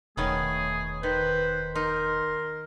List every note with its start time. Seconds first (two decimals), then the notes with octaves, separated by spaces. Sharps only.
0.17 E1 D#3 A3 B3 C#4 G#4
1.03 D#3 B4 C5
1.75 D#4 A#4 C6